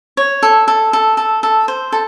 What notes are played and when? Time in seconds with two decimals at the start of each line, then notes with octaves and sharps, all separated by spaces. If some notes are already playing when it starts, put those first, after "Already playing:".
0.17 C#5
0.43 A4
0.68 A4
0.93 A4
1.17 A4
1.43 A4
1.68 C5
1.92 A4